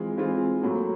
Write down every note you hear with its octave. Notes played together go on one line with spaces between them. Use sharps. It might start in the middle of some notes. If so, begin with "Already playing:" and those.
Already playing: E3 G#3 C4 F4
E3 G#3 C4 F4
A2 F#3 A#3